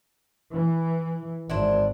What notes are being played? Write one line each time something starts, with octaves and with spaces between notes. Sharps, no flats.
E3
G#1 D4 E4 C5